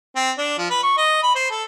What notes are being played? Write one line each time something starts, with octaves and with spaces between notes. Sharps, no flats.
C4
D4
F3
B4
C#6
D#5
B5
C5
A4